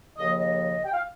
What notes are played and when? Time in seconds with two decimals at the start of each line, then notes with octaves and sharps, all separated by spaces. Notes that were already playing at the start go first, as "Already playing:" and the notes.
0.17 D#2 C#3 F3 A#3 D#5
0.38 D#5
0.85 G5
0.93 F5